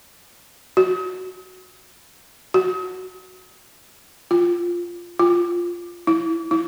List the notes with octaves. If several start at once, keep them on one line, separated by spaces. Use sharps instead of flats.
F#4
F#4
F4
F4
E4
E4